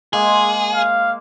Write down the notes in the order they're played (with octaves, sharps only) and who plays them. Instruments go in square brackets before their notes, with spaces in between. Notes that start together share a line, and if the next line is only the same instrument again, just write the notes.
[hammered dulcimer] G#3 A#3 [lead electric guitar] G#4
[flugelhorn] F5